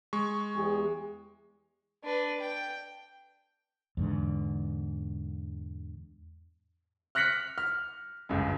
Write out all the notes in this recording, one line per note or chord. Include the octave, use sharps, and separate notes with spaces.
G#3 C#6
E2 G4 G#4
D4 B4
G5
E2 G#2 D3
F6 F#6 A#6 B6 C#7 F#7
F6
G1 C#2 F#2